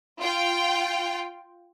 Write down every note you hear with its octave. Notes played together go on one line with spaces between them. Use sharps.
F4 G5